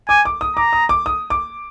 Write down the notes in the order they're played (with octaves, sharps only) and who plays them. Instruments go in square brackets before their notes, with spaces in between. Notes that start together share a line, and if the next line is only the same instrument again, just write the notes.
[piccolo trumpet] G#5 [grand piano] D6
[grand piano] D6
D#6
[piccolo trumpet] A#5 [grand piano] D6
[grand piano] D#6
D6
D#6
D6